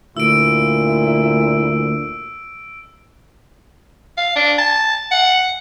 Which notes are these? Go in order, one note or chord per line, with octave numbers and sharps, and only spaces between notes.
D2 A#2 E4 E6 D7
F5
D4
A5
F#5